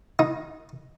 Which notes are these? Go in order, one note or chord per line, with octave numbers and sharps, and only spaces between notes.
D#4